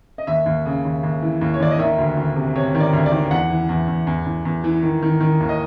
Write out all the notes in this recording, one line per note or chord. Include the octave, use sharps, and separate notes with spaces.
D#5
D#2 E5
D#2
C#3
D#2
D#2
E3
D#2
C#5
D#2 D5
D#5
D#3 E5
D2
D2
C3
C3 C#5
D#3
D5
D2
D5
D#3
E2 F#5
E3
E2
E2
E2
E2
E2
E3
D#3
D#3
D#3
D#2
D#5